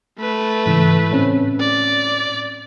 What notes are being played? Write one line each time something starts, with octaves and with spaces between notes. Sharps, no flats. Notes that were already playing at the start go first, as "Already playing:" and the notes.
A3 B4
G#2 C#3 E3
A2 C4 C#4
D5